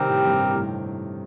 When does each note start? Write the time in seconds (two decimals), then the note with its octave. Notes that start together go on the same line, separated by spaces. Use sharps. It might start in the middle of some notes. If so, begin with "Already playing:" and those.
Already playing: C3 D#3 G3 C4 G4 A#4
0.09 A2
0.26 G2
0.54 A2